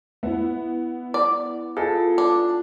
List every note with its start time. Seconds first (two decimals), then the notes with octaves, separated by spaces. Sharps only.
0.23 B3 E4 E5
1.14 D5
1.77 F4 G#4 A4
2.18 D4